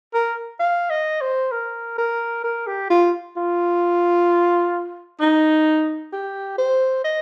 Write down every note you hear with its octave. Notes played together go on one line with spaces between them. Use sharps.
A#4
F5
D#5
C5
A#4
A#4
A#4
G4
F4
F4
D#4
G4
C5
D#5